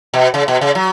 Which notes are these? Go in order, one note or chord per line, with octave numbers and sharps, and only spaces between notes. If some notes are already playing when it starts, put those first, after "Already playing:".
B2
C#3
B2
C#3
F#3